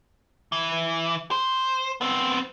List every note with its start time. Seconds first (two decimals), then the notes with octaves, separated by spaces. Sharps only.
0.52 E3
1.31 C5
2.01 B3 C4